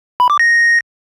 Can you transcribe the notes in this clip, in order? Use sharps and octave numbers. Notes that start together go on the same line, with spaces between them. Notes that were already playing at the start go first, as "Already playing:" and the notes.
B5
D6
A#6